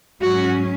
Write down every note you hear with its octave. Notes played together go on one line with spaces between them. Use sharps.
G#2 F#3 C#4 F#4